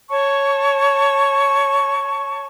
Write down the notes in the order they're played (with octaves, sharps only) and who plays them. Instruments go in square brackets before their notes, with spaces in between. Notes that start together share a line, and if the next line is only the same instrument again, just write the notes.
[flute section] C#5 A5 C#6